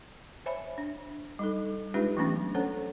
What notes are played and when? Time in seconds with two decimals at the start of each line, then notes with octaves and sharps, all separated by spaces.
0.46 C5 C#5 E5 G#5 B5
0.78 D4
1.39 G3 D#4 A4
1.94 G#3 D4 D#4 F4 G4 B4
2.17 E3 F#3 A3 B3 C#4 D4
2.55 C#4 A4 C5 C#5 F#5 A#5